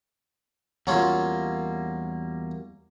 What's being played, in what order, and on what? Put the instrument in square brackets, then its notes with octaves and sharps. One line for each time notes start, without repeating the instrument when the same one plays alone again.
[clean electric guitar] E2 G3 A#3 [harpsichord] F#3 C#4 F4